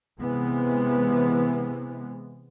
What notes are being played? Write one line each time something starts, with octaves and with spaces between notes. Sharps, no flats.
C3 E3 G#3 B3